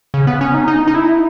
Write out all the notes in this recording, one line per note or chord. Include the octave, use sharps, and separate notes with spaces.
C#3
B3
C#4
D#4
D#4
D#4
E4